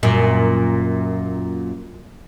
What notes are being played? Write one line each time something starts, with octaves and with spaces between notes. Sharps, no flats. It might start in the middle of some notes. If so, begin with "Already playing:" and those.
F#2 A#2